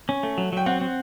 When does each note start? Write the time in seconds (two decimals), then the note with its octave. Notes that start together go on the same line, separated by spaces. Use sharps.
0.09 C#4
0.23 A3
0.38 F#3
0.52 F#3 G5
0.66 C4 F#5
0.81 C4